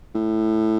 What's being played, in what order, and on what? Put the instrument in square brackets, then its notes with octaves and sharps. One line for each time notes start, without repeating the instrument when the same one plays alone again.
[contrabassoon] A2